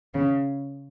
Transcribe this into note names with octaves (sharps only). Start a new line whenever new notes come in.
C#3